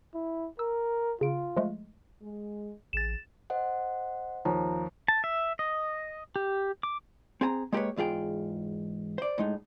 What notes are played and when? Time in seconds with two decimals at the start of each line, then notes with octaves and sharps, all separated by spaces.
0.14 E4
0.59 A#4 E6
1.21 C#3 F4 D7
1.56 F3 G#3 A3
2.21 G#3
2.93 A1 G#4 A6 E7
3.50 C5 D#5 F#5
4.45 D#2 F3 F4 C#5 A#5
5.08 A5
5.24 E5
5.59 D#5
6.36 G4
6.83 D6
7.41 C4 G#4 A5 A#5
7.72 G#3 A#3 G4 A#4 B4 C#5
7.96 E2 G#2 F4 G#4 G5
9.18 C5 D5
9.38 A2 G#3 D#4